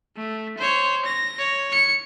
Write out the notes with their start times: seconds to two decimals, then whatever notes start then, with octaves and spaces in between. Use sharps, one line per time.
0.17 A3
0.58 C5 C#5
1.05 A#6
1.39 C#5
1.72 C#7